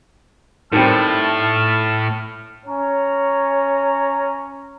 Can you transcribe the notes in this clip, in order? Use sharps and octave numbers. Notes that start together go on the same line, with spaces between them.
A2 D#3 G3 C4 A5 F6
C#4 C#5 A#5